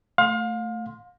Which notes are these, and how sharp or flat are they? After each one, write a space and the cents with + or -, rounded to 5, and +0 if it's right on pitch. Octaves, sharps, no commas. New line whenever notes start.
A3 +10 F5 +30 C6 +0